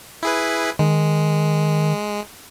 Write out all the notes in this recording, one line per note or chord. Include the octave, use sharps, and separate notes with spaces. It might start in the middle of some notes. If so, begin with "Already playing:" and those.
E4 G#4 B4
D#3 G#3